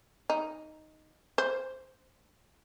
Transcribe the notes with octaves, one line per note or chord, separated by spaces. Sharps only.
D#4
C5